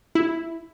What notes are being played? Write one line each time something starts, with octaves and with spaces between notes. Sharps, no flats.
E4